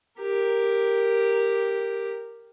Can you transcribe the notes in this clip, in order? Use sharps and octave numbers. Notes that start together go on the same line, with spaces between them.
G4 A#4